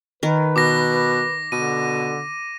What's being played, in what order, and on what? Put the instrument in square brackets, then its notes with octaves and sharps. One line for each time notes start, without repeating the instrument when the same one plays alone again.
[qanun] D#3 A#4 [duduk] B4
[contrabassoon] B2 [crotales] D6 A#6
[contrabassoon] B2 [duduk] D3 [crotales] D#7